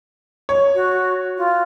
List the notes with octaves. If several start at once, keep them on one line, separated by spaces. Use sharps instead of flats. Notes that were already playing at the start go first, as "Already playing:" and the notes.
C#5
F#4
F4